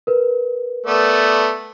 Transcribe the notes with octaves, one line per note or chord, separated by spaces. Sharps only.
A#4 B4
A3 B3 D5